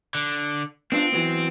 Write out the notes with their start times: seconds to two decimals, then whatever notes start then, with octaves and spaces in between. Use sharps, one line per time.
0.15 D3
0.92 B3 C4 D4 F4
1.12 E3 F#3 B3